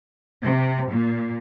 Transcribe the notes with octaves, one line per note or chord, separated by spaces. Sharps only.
C3
A#2